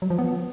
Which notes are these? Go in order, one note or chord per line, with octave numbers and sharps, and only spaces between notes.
F#3
F3
B3